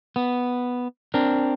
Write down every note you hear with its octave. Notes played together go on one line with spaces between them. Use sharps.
B3
C4 D4 A#4